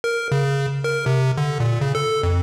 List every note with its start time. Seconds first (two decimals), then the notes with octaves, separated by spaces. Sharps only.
0.04 A#4
0.32 C#3
0.84 A#4
1.06 C3
1.38 D3
1.60 A#2
1.81 C#3
1.95 A4
2.23 F2